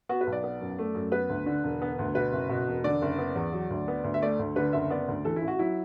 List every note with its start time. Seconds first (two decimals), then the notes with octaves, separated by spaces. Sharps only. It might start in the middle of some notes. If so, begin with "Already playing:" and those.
0.09 B3 F#4
0.21 B4
0.27 B1
0.32 D5
0.44 B3
0.61 F#2
0.79 A3
0.95 F#2
1.12 B3 B4
1.29 D2
1.46 D3
1.64 E1
1.82 B3
1.99 D2
2.15 B2 B4
2.33 F#1
2.49 B2
2.68 E1
2.84 D3 D5
3.02 F#1
3.18 B3
3.36 E2
3.53 F#3
3.70 D2
3.88 B3
4.04 D2
4.14 E5
4.22 A3 D5
4.39 D2
4.56 D3 B4
4.73 F#1 E5
4.90 B3 D5
5.08 D2
5.25 E3 A4
5.36 E4
5.42 A1
5.48 F#4
5.59 F#3 E4